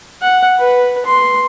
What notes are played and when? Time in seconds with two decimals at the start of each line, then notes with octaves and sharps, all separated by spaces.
0.22 F#5
0.59 B4
1.06 C6